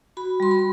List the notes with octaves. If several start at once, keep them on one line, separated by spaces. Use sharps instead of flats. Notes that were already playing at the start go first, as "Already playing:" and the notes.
F#4 B5
G3 C6
B5